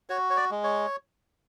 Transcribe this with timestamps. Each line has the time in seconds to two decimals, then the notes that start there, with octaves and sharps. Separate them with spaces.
0.09 F#4 C#5
0.30 C#5
0.37 D5
0.51 G#3
0.64 C#5